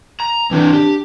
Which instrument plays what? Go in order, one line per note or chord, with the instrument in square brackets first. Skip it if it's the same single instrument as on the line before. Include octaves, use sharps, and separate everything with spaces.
[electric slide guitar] A#5
[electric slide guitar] E3 C4 B4 [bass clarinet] D4
[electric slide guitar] G4